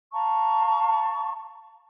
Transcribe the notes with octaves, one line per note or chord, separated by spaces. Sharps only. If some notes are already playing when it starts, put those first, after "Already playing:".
F5 A5 A#5 C#6